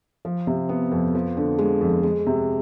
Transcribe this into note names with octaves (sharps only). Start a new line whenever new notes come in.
F3
C3
B3
F2
F3
D3
G#3
F2
G#3
C3